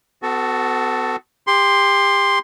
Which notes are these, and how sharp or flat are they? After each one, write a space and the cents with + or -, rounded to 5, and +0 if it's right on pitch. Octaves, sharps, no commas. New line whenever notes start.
B3 +40 F#4 +0 A4 +0
G4 +30 C6 +0